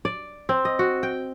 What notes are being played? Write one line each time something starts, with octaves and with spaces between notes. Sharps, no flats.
D5
C4
D#5
F#4
G5